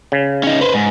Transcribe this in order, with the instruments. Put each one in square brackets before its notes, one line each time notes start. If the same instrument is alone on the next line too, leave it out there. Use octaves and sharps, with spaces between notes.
[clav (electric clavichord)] C#3
[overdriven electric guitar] C#4 D#4
B4 C5
G#2